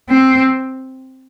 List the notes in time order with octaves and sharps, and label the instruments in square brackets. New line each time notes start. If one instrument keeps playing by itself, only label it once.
[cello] C4